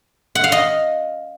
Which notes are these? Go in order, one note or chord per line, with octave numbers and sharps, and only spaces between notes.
F#5
F5
D#5